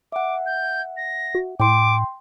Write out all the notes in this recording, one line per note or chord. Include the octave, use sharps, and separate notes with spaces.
E5 F#5 D6
G6
A#6
F#4
A2 G5 C6 D6